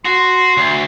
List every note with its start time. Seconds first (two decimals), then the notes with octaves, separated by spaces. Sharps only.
0.05 F#4 C6
0.57 D2